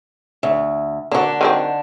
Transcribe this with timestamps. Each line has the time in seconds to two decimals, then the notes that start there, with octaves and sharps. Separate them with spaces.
0.43 D2
1.11 D3 A#3 D4 F#4
1.41 D#3 F#3 C4